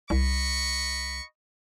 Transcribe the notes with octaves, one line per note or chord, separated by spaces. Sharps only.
C2 D#5 B5 C#6